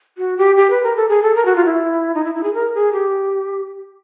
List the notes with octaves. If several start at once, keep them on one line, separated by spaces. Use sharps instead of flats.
F#4
G4
G4
B4
A#4
A4
G#4
A4
A#4
F#4
F4
E4
D#4
E4
E4
G#4
A#4
G#4
G4